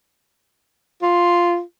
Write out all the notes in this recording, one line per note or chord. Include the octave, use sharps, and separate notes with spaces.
F4